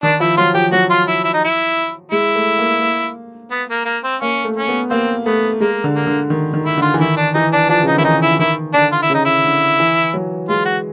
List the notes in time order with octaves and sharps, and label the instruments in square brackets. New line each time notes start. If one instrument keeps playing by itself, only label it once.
[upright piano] D#3 [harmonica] D4
[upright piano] F3 [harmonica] E4
[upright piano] F#3 [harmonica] F4
[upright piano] F3 [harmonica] G4
[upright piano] F#3 [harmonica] F#4
[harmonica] F4
E4
E4
D#4
E4
[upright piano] G#3 [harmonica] E4
[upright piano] A3
A#3
A#3
[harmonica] B3
A#3
A#3
C4
[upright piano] A#3 [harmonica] C#4
[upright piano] A3
[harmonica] C#4
[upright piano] B3
[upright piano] A#3 [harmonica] C4
[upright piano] A3 [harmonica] B3
[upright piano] G#3 [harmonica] A#3
[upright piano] D3
[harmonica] A#3
[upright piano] D3
D#3
D#3
[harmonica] E4
[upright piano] D3
[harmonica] F4
[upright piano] E3
[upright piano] D#3 [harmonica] E4
[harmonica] D4
[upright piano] E3 [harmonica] D#4
[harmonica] D4
[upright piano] F3 [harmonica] D4
[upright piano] C#3
[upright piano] D3 [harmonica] D#4
[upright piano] D#3 [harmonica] E4
[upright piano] E3 [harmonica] D#4
[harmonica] E4
[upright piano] E3
[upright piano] D#3 [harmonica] E4
[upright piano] D3 [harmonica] D4
[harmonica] F4
E4
[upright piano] C#3
[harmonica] D#4
E4
[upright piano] D3
E3
F#3
[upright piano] G#3 [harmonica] F4
[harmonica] F#4